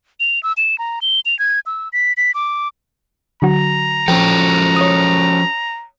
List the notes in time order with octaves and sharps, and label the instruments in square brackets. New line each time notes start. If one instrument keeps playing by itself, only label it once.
[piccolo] F7
E6
E7
A#5
G7
F7
G#6
E6
B6
B6
D6
[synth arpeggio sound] D3 F#3 F#4 [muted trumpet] A#5
[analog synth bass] F3 [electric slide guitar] C#4 F#4 A4 [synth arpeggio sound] G5
[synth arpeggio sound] C#5 D#6